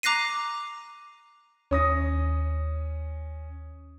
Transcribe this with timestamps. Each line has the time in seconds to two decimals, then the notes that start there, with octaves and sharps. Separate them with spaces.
0.03 A#5 D6 F#6 A#6 C7 D#7
1.71 D#2 C#4 D#6 A#6